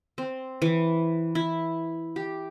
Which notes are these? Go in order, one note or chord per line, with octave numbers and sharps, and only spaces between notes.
C4
E3
E4
G4